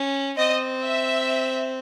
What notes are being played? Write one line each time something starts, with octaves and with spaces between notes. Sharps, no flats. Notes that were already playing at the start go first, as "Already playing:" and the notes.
Already playing: C#4
C4 D#5
E5